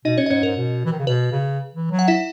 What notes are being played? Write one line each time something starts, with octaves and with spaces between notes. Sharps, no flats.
B2 D#4 D#5
C#4 C#5
D#5
G#2 C#4 C#5
G#2 A#4
B2
E3
D#3
C#3
B2 B4
C#3
E3
F#3
F#5
E4 E5